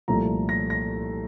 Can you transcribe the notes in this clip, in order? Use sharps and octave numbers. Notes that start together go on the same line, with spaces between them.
C2 A#2 F3 A3 A#5
A#6
A#6